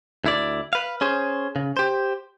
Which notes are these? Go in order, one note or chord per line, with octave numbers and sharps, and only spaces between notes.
D2 E4 D5
B4 F5
C#4 G#4 C5
C#3
G4 C5